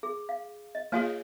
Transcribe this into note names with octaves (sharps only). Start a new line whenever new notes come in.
G#4
F5
D#5
A#3 F4 G#4 C#5 F5 G#5